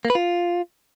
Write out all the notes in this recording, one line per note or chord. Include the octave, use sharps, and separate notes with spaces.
A#3
B4
F4